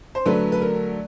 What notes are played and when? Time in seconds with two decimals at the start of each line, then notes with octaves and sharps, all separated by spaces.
0.15 C5
0.25 D3 F#3 A3 B4
0.52 B4
0.62 A#4